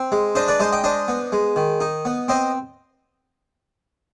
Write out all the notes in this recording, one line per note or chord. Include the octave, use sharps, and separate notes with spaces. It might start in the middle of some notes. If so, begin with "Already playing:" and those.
Already playing: C4
G#3
D4 C5 D#5
B4 D5
G#3 C5 D#5
D#5 G5
D4 C5 D#5
B3
G#3
D#3
D#4
B3
C4 C5 D#5